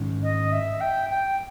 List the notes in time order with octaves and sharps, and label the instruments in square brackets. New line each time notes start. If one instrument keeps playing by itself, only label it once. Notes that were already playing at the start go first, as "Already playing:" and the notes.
Already playing: [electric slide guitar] G#2 D#3 G#3 C#4
[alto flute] D#5
E5
G5
G5